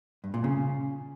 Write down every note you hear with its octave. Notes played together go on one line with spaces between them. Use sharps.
G2
A#2
C#3